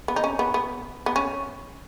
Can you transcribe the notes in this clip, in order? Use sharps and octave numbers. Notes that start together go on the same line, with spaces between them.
B3
D#4
C#4
B3
B3
B3
C#4